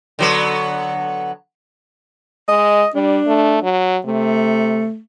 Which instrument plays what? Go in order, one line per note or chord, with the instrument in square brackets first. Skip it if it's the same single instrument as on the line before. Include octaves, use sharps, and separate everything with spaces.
[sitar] D3 F#3 B3
[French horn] G#3 [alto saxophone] D#5
[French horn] G3 [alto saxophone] D4
[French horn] A3
F#3
[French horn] C3 [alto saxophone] A3